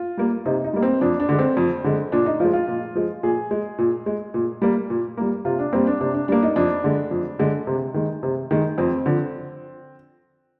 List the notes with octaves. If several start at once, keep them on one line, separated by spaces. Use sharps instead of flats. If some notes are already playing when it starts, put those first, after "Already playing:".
Already playing: F4
G3 A#3
C3 D#4
D#4
G3 A#3
C4
F2 D4
D4
D3 G#3
C4
F2
D3 G#3
A#2 D4
D#4
F3 G#3 F4
F4
A#2
F3 G#3
A#2 G#4
G#3
A#2
G#3
A#2
G3 A#3
A#2
G3 A#3
C3 F4
D4
G3 A#3 C4
D4
C3 D4
D4
G3 A#3 D4
D#4
F2 D4
D3 G#3
F2
D3 G#3
C3
D#3 G#3
C3
D#3 G#3
F2 C4
D3 F3